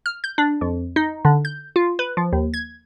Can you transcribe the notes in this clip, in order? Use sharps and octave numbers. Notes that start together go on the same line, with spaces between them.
F6
G6
D4
F2
D#4
D3
G6
F4
B4
F3
D#2
G#6